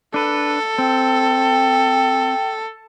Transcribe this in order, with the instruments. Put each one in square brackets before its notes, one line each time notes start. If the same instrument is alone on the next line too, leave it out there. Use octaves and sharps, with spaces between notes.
[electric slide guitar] D4 B4 [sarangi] A4
[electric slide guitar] C4 [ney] G5